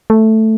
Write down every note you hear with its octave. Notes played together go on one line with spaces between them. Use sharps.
A3